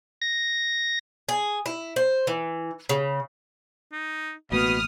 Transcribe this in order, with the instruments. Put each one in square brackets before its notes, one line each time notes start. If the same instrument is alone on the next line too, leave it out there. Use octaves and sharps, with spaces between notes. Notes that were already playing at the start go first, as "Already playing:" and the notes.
[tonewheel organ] A#6
[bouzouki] G#4
E4
C5
E3
C#3
[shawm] D#4
[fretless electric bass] A1 A3 A#3 [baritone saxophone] B2 [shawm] B5 [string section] D#6 F6